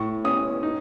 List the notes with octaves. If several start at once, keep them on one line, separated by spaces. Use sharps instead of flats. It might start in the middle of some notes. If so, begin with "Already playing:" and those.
Already playing: A2 C#6
C#4 D#6
D#4